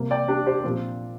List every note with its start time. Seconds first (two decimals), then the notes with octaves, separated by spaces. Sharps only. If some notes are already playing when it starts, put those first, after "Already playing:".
Already playing: C3 G3 A#3
0.11 D5 G5
0.28 D4 G4
0.46 G4 C5
0.64 A#2 F3 C4